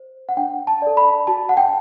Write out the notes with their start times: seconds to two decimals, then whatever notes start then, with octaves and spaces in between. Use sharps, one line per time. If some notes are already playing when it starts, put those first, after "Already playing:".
Already playing: C5
0.29 F#5
0.37 D4 G5
0.67 A5
0.82 A4 D5
0.97 B5
1.27 F#4 A5
1.49 F#5
1.57 G5